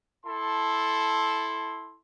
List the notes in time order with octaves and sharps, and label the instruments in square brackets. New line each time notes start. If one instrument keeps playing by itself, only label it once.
[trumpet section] E4 A4 A5 C6